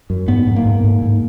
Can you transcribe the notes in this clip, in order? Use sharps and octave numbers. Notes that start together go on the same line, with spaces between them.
F#2
G#2 B3
G#2
A#3
G#2
G#2
G#2